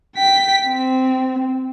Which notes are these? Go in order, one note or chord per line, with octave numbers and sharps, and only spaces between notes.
G5 B6
C4